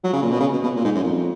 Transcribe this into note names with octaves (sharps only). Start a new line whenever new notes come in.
F#3
C#3
A#2
B2
C#3
B2
B2
A#2
G#2
F#2
F2